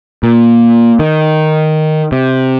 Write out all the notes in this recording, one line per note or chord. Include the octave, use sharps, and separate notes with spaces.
A#2
D#3
C3